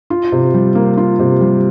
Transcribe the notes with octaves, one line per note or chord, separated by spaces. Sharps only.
F4
C3
G3
A#3
F4
C3
G3